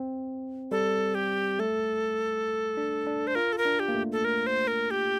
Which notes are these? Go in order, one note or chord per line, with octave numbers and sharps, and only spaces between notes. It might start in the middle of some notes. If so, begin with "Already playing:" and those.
Already playing: C4
G3 A4
G4
A3 A4
D4
D4
C5
F4 A#4
A4
A#4
D4
G4
A#3
A3
A4
A#4
C5
A#4
G4